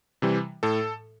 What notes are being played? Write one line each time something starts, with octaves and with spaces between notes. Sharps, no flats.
C3 E3 G3
A2 A4